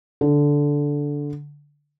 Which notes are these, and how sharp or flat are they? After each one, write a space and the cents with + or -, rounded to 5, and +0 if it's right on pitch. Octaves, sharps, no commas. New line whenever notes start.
D3 -10